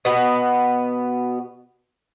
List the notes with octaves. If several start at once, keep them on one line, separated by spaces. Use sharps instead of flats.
B2 B3